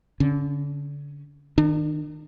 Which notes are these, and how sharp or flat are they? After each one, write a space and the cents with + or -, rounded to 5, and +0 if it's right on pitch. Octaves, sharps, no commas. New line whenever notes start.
D3 -30 C#4 -5
D#3 +0 D4 +40